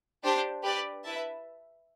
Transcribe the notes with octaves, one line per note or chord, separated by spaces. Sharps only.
D4 G4 C5
G4 B4 D5
E4 B4 E5 A5